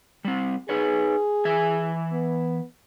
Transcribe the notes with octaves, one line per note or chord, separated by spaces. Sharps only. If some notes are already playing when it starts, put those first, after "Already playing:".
G3 C4
D#4 G#4 B4 C#5
E3 E5 G#5
B3